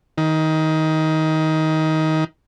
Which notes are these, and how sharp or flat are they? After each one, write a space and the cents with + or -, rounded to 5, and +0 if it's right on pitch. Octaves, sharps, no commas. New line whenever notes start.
D#3 +20